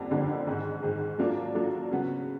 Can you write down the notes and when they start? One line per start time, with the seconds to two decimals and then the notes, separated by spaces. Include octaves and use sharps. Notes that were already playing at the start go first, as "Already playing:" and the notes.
Already playing: F2 D3 G3 A#3 D4
0.11 F2 D3 G3 A#3 D4
0.47 G#2 D#3 G#3
0.82 G#2 D#3 G#3
1.18 F#3 A#3 D4 F4 A4
1.55 F#3 A#3 D4 F4 A4
1.91 C#3 F#3 B3